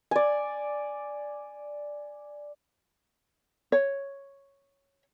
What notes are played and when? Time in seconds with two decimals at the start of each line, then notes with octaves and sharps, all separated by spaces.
0.11 D5 G#5
3.72 C#5